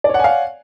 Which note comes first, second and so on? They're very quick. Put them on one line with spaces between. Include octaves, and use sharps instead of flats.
D5 C#5 F#5 G#5 F5